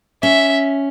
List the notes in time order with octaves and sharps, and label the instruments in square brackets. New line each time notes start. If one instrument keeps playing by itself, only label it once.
[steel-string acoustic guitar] C#4 [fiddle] E5